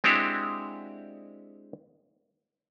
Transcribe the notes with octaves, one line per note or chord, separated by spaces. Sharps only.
G#3 C4 D4 E4 F#4 G4